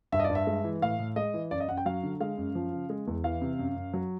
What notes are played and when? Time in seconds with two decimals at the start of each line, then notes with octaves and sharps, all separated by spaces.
0.12 G2 E5
0.20 D#5
0.24 D5
0.29 G2
0.35 E5
0.47 G#3
0.64 E3
0.82 A2 F5
0.99 A2
1.16 G#3 D#5
1.34 E3
1.51 F#2 D5
1.60 D#5
1.68 F#2 F#5
1.77 G5
1.86 F#3 F5
2.03 D3
2.20 G#3 F5
2.38 F#2
2.55 F3
2.73 C#3
2.90 G#3
3.07 E2
3.24 E3 F5
3.41 C3
3.59 F#2
3.76 F#2
3.93 F#3